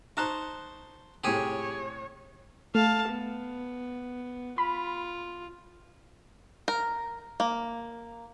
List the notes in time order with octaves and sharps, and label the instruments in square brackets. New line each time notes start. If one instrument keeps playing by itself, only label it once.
[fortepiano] D#4 A#5 F#6 [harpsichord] C5 A5 C#6
[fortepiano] A2 C3 [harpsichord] G4 G#4 G#5 [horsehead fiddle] C#5
[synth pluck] A3 [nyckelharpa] F5 A5
[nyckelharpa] B3
[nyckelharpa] F4 [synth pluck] B5
[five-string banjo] A#4
A#3